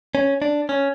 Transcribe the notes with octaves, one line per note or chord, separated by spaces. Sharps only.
C#4
D4
C#4